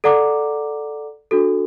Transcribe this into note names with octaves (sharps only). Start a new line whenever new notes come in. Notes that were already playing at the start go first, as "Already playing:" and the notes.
A4 D5 F#5 A#5 D6
D4 F#4 A4